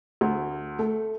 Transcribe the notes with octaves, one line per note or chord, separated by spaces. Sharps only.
D2
A3